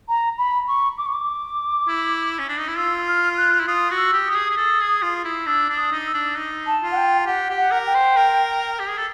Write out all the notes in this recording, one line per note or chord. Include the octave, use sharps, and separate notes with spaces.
A#5
B5
C#6
D6
C#6
D6
E4
C#4
D4
D#4
E4
F4 E6
F6
F#6
E4
F4 D#6
F#4
E6
G4
G4 D#6
G#4
G#4
A4
G#4
F4
E4
D4 E6
D4
D#6
D#4
E6
D4
D#4
A5
F4
F#5
G5
G4 F#5
G4
F#5
A#4
G5
C5
A#4
G4
G#4
A4